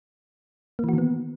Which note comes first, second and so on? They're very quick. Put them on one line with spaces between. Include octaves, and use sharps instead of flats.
A#3 E3 F#4 D#3 B3